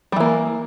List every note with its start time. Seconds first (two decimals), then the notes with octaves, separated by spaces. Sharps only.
0.12 G3
0.16 E3
0.20 A#3